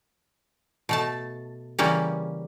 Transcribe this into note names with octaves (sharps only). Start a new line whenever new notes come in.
B2 A3 A5
C#3 E3 G3 A#3 C#4